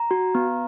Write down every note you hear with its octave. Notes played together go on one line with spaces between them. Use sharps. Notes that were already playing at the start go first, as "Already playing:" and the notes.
Already playing: A#5
F#4
B3